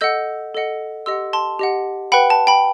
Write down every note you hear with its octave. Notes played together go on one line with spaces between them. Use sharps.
A4 D#5 F#5 E6 G6
A4 D#5 F#5
G4 D#5 F#5 C6 E6
A5 C6
G4 D#5 F#5
B4 F#5 G5 B5
A5
G5 B5